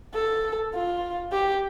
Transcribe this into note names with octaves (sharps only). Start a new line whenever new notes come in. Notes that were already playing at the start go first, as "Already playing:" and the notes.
A4
F4
G4